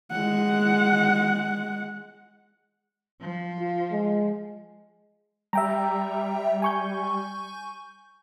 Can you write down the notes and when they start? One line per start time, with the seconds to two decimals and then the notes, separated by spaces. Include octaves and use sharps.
0.11 G#3 F#5
3.21 F3
3.59 F4
3.93 G#3
5.53 G3 E5 G5 A#5
6.62 G#5 C#6 G6